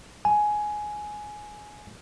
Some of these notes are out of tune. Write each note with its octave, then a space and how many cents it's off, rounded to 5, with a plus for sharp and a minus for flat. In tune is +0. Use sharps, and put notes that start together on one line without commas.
G#5 +10